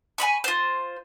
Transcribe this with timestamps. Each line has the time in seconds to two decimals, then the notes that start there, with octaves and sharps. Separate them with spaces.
0.18 G#5 A#5 B5 C#6
0.44 F4 C5